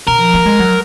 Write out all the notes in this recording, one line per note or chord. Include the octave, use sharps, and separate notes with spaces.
B2 A#4
F3
A#3
G#3
F#3